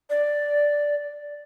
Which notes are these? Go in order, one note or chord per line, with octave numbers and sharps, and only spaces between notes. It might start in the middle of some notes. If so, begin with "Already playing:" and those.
D5